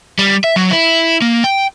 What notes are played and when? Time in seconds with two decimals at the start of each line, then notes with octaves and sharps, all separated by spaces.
0.19 G3
0.44 E5
0.56 F#3
0.71 E4
1.22 A#3
1.44 G5